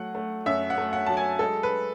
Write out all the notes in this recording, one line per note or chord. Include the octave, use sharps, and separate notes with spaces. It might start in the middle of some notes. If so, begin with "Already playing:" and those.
Already playing: F#3 A3 F#5
A3
F#2 E5
F#5
A3
F#5
F#3 A5
G#5
G#3 A4
B4